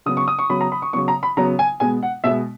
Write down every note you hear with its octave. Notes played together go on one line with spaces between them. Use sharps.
C#3 F#3 B3 D#6
C#6
D#6
C#6
C#3 F#3 B3 B5
A#5
B5
C#6
C#3 F#3 B3 C#6
A#5
B5
C#3 F#3 B3 A#5
G#5
B2 G#3 B3 G#5
F#5
B2 G#3 B3 E5